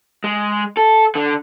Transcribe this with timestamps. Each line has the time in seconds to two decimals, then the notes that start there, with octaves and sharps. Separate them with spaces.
0.24 G#3
0.77 A4
1.15 D3